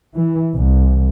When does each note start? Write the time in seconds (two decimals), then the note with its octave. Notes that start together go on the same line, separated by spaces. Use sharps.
0.16 E3
0.54 C2